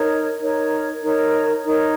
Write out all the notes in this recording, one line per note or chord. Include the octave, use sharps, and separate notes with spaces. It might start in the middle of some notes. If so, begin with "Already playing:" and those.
Already playing: D#4 A#4 C#5
D#4 A#4 C#5
D#4 A#4 C#5
D#4 A#4 C#5